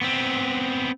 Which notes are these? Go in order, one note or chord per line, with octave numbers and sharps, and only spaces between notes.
B3 C4